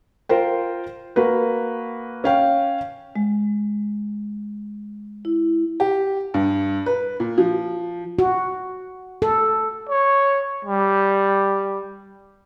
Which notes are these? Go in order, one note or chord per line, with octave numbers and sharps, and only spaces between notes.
F4 A#4 C5 G5
A#3 F#4 B4
C#4 F5 G5
G#3
E4
G4
G2
B4
A#2
F3
F#4
A4
C#5
G3